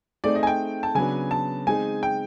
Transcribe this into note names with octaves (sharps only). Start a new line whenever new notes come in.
A3 C4 D#4 G#4 D5
D#5
G#5
G5
A5
C#3 F#3 B3 D4 G#5
A5
G#3 C4 D#4 G#4 G#5
G5